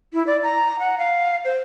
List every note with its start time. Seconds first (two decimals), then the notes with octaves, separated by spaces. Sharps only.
0.14 E4
0.27 D5
0.43 A#5
0.79 F#5
0.98 F5
1.45 C5